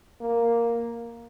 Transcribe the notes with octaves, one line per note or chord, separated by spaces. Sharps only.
A#3